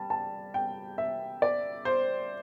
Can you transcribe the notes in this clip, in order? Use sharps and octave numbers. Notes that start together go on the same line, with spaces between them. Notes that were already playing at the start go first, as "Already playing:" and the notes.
Already playing: G3 A5
A5
G5
E5
D5
C5